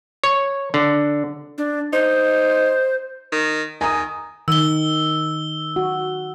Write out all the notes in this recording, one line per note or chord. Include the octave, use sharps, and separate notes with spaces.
C#5
D3
D4
D#4 C5
D#3
D#3 G#5 A#5 D#6
D#3 E6 G7
F#4